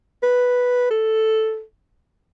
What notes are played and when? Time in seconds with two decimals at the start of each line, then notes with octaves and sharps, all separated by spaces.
0.23 B4
0.91 A4